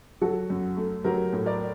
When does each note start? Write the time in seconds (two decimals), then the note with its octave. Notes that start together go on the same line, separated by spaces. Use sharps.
0.21 F#3 F#4 A4
0.50 F#2
0.77 A3
1.04 F#3 G4 A#4
1.33 A2
1.46 A#4 D5